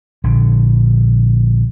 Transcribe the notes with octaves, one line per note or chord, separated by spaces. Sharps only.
A#1 D3